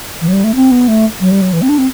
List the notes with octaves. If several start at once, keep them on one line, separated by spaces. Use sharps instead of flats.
E3
F#3
G3
A3
C4
B3
A3
F#3
G3
F#3
E3
C4
D4
C4